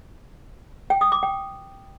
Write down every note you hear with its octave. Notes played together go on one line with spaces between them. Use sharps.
G5
D#6
D6
G5